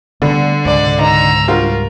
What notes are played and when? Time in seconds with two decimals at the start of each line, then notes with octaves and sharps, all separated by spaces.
0.22 D3 G3 A3 B3
0.65 C#2 G#2 C3 D5
1.00 D#4 A#5 E6
1.48 G3 F4 F#4 A#4